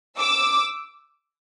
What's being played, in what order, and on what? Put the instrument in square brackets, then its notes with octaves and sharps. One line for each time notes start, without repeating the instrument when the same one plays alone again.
[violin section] D6 E6